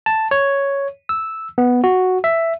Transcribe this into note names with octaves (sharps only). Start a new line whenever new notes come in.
A5
C#5
E6
B3
F#4
E5